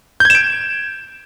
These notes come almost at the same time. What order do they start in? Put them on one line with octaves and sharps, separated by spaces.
G6 G#6 E7 D7